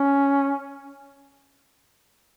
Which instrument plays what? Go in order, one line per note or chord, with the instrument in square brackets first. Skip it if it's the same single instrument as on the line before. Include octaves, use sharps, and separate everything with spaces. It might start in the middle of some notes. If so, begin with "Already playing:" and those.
Already playing: [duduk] C#4